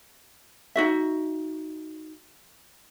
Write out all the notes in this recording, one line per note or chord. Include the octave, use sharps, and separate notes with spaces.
D#4 F#4 E5